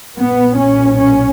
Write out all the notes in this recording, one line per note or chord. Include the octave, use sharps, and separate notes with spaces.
B1 A#2 B3
C#4
C#4